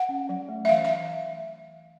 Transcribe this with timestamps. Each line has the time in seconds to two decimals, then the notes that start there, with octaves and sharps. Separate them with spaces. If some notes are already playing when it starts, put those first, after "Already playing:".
Already playing: F#5
0.09 C#4
0.29 F#3
0.49 A3
0.65 E5
0.69 E3 F5
0.85 E5